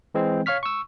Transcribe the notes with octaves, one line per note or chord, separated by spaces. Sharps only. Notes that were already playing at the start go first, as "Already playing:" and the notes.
E3 G#3 C4
C#5 F5 C#6 F6 B6
C#6 E6